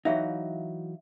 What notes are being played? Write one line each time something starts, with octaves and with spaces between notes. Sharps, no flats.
E3 F#3 D#4 E5 F5